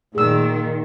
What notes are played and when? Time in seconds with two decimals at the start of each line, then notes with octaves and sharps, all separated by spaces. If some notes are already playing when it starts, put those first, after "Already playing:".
0.15 A#2 D#3 G#4 E6